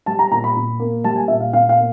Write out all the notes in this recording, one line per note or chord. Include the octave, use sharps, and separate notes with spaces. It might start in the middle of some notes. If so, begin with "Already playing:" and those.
G3 A5
A#5
A#2 A#5
B5
A#2
A#3
G3 A5
G#5
A#2 E5
F5
A#2 F5
F5
A#3